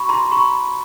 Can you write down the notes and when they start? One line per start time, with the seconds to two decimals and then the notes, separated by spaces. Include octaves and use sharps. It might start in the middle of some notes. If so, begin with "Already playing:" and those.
Already playing: F#4 B5 C#6
0.09 A#5 C6
0.32 B5 C#6